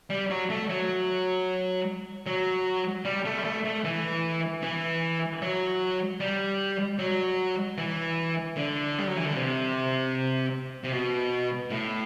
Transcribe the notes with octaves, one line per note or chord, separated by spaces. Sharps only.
G3
F#3
A3
F#3
F#3
G3
A3
G3
A3
A3
E3
E3
F#3
G3
F#3
E3
D3
G3
F#3
E3
D3
C3
C3
B2
A2